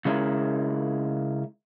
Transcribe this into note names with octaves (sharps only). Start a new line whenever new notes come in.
C#3 G#3 C#4 E4 A#4